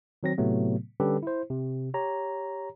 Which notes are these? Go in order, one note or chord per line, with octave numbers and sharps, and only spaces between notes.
D#3 F#3 C4 A#6
A2 C3 F#3 A3 B3
D3 G3 C#4 G4 A4 B4
E4 C5
C3
G4 C#5 A#5